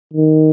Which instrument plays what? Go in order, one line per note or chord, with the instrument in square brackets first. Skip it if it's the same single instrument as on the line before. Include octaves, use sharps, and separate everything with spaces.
[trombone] D#3